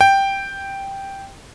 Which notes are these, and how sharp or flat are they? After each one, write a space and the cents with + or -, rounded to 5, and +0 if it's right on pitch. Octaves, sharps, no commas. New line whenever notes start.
G5 +0